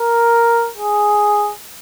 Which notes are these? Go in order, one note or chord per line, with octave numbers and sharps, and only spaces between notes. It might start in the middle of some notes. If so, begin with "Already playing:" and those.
Already playing: A#4
G#4